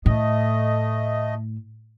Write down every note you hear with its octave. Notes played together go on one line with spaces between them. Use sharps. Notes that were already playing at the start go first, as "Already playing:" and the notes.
A2 A3 D#5